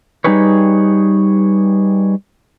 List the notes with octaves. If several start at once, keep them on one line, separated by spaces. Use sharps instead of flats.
G3 D#4 G4 G#4 B4 C#5